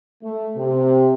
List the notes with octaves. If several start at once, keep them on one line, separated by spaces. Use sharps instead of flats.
A3
C3